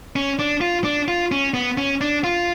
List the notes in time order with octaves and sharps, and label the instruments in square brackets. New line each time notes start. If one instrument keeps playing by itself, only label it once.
[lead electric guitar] C#4
D4
F4
D4
F4
C#4
B3
C#4
D4
F4